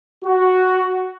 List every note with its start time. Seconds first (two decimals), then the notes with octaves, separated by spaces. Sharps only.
0.25 F#4